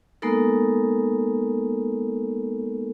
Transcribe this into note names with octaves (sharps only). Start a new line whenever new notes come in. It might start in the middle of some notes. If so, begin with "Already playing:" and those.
G#3 A#3 B3 D#4 A4 A#4